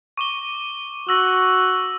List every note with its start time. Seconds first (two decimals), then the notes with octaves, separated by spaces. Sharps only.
0.17 C#6 D6 G7
1.09 F#4 E6 A#6